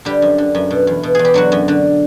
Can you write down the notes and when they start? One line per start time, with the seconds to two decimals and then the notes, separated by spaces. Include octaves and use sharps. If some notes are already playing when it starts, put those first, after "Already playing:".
0.05 D3 G3 G4
0.22 F#2
0.38 D3
0.55 F#2
0.71 B2
0.87 E2
1.03 B2
1.15 E2 G#4
1.25 G4
1.34 D3 F#3 F#4
1.52 F#2
1.68 D3